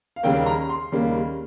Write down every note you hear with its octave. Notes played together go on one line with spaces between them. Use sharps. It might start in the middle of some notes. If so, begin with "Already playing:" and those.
F5
D#2 C#3 G3 A#3 G5
A#5
C6
D#2 C#3 G3 A#3